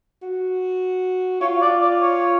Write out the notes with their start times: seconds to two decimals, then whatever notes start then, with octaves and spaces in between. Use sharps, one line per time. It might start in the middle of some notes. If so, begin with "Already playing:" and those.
0.23 F#4
1.41 F4 C#5
1.62 D5
1.81 D5
2.01 C#5